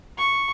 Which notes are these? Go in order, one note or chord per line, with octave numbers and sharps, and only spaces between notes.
C#6